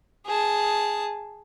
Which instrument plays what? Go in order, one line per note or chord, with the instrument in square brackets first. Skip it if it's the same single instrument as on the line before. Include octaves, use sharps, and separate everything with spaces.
[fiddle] G#4 A5